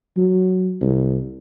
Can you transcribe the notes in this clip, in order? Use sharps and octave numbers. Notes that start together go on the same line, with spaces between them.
F#3
C2